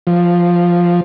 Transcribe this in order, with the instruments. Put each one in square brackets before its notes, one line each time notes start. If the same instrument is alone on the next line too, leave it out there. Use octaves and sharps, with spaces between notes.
[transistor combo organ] F3